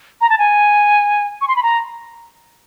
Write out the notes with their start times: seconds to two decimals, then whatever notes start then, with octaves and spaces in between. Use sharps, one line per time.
0.21 A#5
0.30 A5
0.38 G#5
1.41 C#6
1.48 C6
1.56 B5
1.63 A#5